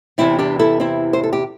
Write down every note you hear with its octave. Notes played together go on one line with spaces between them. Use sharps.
E2 C3 E3 C4 E4
D4 G4
E4 A4
C4 E4
C5
A4
G4